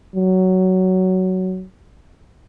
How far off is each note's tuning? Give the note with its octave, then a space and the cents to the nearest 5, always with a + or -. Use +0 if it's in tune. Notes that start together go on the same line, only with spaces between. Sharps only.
F#3 +10